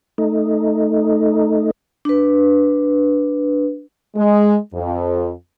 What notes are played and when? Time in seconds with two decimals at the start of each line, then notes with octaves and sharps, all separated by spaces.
0.18 A3 D#4
2.05 D4 B4
4.16 G#3
4.74 F2